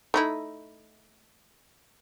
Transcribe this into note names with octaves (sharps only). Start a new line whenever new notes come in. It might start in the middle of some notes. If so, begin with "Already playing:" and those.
A3 D#4 E4